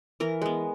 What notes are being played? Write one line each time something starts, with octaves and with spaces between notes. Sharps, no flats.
E3 A#4
G#3 B3